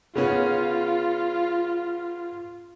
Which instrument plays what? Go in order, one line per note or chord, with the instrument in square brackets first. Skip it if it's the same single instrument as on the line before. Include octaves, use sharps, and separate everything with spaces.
[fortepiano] C#3 B3 C#4 [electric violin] F4